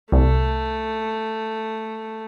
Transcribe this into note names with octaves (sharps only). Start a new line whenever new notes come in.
C2 A3